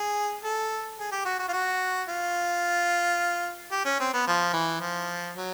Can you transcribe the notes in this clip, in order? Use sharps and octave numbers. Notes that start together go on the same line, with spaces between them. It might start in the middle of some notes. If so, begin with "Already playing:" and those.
Already playing: G#4
A4
G#4
G4
F#4
F#4
F4
F#4
F4
G4
C#4
C4
B3
F3
E3
F3
F#3